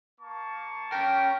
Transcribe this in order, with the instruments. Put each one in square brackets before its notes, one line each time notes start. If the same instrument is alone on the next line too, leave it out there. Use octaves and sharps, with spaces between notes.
[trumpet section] A#3 A5 C#6
[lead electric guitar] C#4 A#4 [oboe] G5